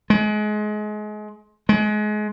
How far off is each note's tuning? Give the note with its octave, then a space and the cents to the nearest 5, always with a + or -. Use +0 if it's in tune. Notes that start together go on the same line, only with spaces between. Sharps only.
G#3 +30
G#3 +30